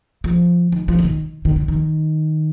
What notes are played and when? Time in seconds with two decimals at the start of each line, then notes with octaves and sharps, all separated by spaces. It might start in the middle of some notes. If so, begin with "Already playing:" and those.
0.24 F3
0.72 D#3
0.88 F3
0.99 D3
1.04 D#3
1.45 D#3
1.56 D3
1.68 D#3